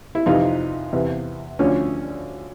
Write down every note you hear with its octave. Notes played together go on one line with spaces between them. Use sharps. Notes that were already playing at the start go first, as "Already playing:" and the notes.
E4
F2 C3 E3 D#4 F4
E2 C3 E3
D2 D3 F3 C#4